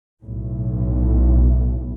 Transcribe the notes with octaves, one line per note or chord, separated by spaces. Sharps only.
B1 A2